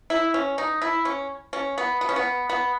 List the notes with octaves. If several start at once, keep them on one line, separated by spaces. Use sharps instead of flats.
E4
C#4
D#4
E4
C#4
C#4
B3
B3
C#4
B3
B3